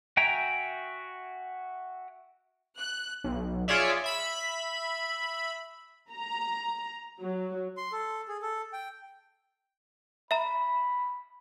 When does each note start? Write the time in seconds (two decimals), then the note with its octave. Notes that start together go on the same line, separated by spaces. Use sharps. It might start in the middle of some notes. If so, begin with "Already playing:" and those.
0.17 F#4 E5 G5 G#5 A#5
2.78 F#6
3.24 B1
3.68 F4 G#4 C#5 D5 E5
4.04 E5 B5
6.10 A#5
7.19 F#3
7.77 C6
7.92 A4
8.28 G#4
8.42 A4
8.73 G5
10.31 E5 A#5 B5